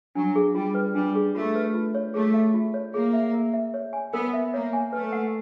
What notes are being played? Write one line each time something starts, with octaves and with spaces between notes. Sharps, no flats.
F#3 D4
G#4
G3 F4
B4
G3 D4
G#4
A3 F4
B4
F4
C#5
A3 G#4
E5
F4
C#5
A#3 G#4
E5
A#4
E5
C#5
G#5
B3 A#4
E5
A#3 C#5
G#5
A3 B4
F#5